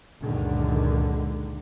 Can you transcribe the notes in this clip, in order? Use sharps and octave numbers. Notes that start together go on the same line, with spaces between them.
C#2 F#2 A#2 D3 D#3